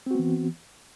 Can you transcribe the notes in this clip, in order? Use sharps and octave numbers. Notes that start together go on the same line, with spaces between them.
E3 B3 C4 F#4